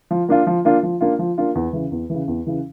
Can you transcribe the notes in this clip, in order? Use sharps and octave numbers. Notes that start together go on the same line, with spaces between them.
F3
A#3 D4 F4
F3
A#3 D4 F4
F3
A#3 D4 F4
F3
A#3 D4 F4
E2
C#3 E3
E2
C#3 E3
E2
C#3 E3